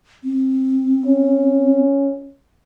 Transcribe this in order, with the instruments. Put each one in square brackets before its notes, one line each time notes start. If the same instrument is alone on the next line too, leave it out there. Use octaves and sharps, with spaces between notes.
[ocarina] C4
[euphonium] C#4